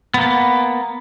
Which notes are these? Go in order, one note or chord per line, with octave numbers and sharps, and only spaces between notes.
A#3 B3